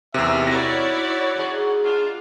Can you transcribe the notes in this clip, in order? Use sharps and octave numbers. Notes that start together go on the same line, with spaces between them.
E2 C3 D#4 A#4 E5
E4 F#4 C#5 D5 A#6
G#2 G#4
D4 F4